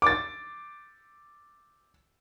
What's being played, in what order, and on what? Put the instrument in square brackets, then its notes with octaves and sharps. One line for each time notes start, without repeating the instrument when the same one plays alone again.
[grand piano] D6 A6